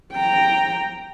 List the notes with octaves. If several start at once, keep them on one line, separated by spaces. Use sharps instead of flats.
G5 A#5